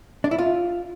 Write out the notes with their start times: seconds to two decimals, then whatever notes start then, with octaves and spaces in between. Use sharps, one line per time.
0.24 D4
0.31 E4
0.38 F4